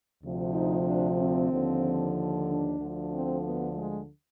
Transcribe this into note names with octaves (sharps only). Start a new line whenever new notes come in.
D2 C3 F3
D#4
D4
C4
D#2 D3 F3
D4
D2 D3 F3
C4
B3
G#3